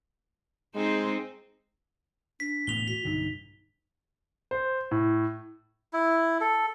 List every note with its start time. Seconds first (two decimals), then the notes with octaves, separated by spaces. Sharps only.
0.75 G#3 C4 D#4 C5
2.40 D4 B6
2.67 E1 A2 B3 F7 G7
2.88 F#4 B6
3.05 B1 G2 D3 D#4
4.51 C5
4.91 A2
5.93 E4
6.41 A4